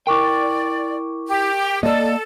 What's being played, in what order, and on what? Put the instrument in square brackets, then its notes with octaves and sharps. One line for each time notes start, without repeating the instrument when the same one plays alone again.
[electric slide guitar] E4 G5 [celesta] A#4 C#6 D6 [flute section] D5
[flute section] G4
[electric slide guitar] A#3 [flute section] A4 [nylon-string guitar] D5 D#5